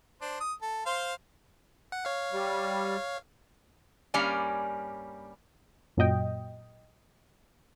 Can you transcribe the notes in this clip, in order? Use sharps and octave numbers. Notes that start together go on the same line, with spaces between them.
D4 C5
D#6
A4
C5 F5 C6
F#5
C#5 F5
G3
G2 G3 A#3 C#4 D5 G#5
F#2 A#2 F#3 D#5 G5